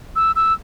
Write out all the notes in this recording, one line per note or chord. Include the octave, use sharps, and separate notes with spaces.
E6
E6